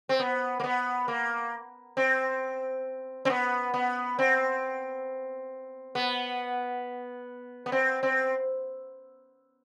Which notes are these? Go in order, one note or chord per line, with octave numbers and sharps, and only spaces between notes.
C4
B3
A#3
B3
A#3
C4
C4
B3
B3
C4
B3
B3
C4
C4